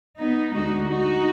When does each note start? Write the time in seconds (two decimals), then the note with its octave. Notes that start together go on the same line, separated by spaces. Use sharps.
0.18 B3 D#4
0.54 D2 D3 G#3 D#4 F#4
0.90 D#4 F#4